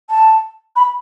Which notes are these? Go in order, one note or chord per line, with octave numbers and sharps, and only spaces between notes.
A5
B5